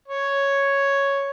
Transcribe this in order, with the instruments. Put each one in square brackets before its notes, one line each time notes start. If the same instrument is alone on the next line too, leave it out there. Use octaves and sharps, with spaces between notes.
[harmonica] C#5